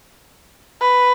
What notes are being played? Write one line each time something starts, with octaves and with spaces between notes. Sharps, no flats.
B4